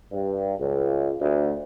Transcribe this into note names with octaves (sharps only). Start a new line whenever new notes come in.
G2
C#2
D2